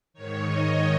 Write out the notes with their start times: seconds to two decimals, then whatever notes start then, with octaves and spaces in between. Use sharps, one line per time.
0.14 G#2 D#3 C#5
0.45 D#5